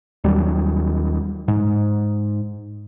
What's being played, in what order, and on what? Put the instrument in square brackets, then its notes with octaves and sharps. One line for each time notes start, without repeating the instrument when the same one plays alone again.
[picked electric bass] D#2 F#3 G3
G#2